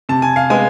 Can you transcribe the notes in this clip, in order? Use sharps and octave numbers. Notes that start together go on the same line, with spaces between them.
C3 A5
G#5
F5
G#3 B3 G#5